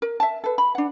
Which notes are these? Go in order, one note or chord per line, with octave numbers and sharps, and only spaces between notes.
A#4
E5 A5
A4 B4
B5
D4 F#5